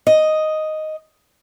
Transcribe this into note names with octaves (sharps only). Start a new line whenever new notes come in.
D#5